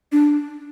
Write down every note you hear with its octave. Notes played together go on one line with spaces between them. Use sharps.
D4